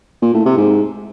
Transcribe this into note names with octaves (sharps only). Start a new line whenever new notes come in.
A#2
A2
C3
G#2